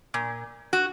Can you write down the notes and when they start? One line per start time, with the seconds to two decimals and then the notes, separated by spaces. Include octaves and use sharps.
0.14 A#2
0.73 F#4